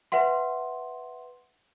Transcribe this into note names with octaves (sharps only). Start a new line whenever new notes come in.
B4 E5 F#5 C6